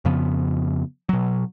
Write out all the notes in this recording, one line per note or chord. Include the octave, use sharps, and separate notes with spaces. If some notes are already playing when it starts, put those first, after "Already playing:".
F2 C#3 F3 B3
B2 F#3